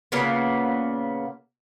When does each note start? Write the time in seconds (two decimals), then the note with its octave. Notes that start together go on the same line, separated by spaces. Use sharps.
0.12 A#2 C#3 A#3 B3